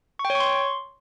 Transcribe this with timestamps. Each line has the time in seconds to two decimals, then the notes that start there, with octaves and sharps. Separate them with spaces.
0.19 C#6
0.25 G5
0.30 C#5
0.35 C#6
0.40 C6